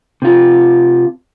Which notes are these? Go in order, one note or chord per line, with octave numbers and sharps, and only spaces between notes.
C3 F4